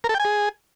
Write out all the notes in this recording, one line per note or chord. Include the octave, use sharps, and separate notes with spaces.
A#4
A4
G5
G#5
G#4